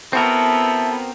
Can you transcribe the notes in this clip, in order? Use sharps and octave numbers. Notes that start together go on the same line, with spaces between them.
B3 C4 E4 F#4 A4 A#4